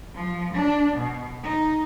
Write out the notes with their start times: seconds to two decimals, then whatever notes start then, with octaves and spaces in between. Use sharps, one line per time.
0.15 F3
0.54 D4
0.97 B2
1.43 D#4